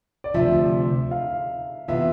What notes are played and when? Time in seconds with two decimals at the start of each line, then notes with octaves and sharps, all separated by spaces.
0.24 D5
0.34 D2 C3 F3 E5
1.11 F5
1.88 C3 E3 B3 F4 E5